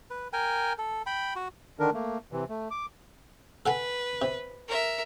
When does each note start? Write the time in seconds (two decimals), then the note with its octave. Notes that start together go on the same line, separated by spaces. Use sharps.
0.10 B4
0.33 A#4 G5 G#5
0.78 A4
1.06 G5 B5
1.36 F#4
1.79 D3 D#3 D4 A#4
1.94 A3 A#3
2.32 C3 E3
2.49 A3
2.71 D6
3.66 A4 B4 F#5 G#5
4.22 C3
4.68 A#4 E5